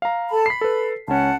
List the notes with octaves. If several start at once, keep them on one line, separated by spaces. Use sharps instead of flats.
F5 A#5
A4 A5 B5
B5 B6 C7
A4 B4
C#2 C#4 F#5 A5